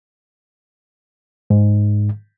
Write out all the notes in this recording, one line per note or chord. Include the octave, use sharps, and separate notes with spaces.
G#2